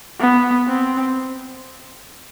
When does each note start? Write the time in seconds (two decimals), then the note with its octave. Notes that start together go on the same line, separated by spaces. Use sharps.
0.20 B3
0.67 C4